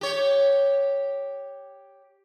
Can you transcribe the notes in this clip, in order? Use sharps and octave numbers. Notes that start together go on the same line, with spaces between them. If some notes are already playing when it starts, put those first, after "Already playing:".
G4 C#5